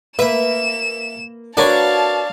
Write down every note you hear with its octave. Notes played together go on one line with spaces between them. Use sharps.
A#3 B4 E5 E7
D4 F#4 A#4 B4 C#5 F5 A5